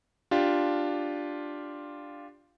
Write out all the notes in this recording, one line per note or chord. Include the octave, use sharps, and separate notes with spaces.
D4 F4 G4